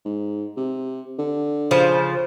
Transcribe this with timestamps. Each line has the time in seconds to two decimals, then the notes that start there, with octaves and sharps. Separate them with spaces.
0.05 G#2
0.57 C3
1.19 D3
1.71 C#3 F3 C5